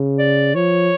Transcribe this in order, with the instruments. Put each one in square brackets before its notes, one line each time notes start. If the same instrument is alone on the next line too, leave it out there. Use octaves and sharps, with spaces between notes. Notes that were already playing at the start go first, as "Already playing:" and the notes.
Already playing: [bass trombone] C#3
[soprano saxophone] D5
[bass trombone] F3 [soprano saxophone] C#5